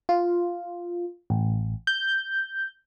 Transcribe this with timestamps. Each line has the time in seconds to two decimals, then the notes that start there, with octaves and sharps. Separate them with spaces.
0.09 F4
1.30 A1
1.87 G6